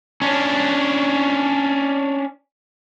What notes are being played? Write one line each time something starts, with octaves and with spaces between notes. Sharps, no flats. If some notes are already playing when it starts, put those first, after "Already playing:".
C#4 D4